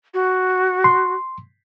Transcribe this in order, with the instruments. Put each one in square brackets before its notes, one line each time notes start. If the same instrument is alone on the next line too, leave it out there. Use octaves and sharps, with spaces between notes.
[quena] F#4
[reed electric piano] C6